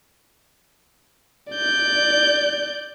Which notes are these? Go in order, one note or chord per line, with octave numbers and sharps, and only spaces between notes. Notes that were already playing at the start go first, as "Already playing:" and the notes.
D5 G6